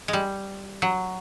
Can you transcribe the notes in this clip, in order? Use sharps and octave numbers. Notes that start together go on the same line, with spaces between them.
G#3
G3
F#3